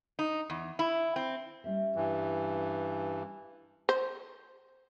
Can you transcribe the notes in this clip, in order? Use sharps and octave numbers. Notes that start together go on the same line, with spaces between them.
D#4
E2
E4
C4
G3 C#4 E5
G2 E3
C5